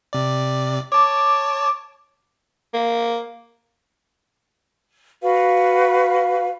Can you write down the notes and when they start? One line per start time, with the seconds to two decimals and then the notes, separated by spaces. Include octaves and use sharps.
0.13 C3 D5
0.92 C#5 A5 D6
2.74 A#3
5.22 F#4 B4 F5